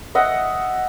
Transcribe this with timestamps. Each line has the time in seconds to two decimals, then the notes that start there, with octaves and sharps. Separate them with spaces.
0.15 D#5 E5 F#5